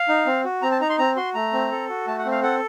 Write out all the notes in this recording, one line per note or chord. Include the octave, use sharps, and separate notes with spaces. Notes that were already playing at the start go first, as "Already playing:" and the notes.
Already playing: F5
D#4
C4
F#4
C4 A#5
A5
D#4 A#5
C6
C4 A#5
F#4 C6
A3 A#5
C4
A4
F#4
A3 A5
F#5
C4
F5
A4 F#5